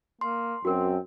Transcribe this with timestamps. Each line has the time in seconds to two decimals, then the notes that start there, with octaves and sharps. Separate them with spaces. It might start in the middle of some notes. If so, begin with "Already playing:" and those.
0.21 A#3 C6
0.65 F#2 C4 F#4 A#4